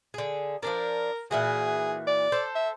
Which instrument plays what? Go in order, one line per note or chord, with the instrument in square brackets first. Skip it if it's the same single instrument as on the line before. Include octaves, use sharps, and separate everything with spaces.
[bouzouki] D3 G#4
[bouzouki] F3 D4 D5 [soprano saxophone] A#4
[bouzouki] A#2 E3 F#4 [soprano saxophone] G#4
[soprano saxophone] D5
[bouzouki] A4 C5
[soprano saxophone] E5